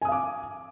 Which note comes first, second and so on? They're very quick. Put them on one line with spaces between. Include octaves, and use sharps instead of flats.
G#5 D#6 F5 D6